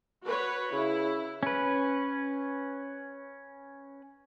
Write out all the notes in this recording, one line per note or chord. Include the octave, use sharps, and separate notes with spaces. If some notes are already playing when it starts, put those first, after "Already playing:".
F#4 B4 C#5
C#3 E4
C#4 B4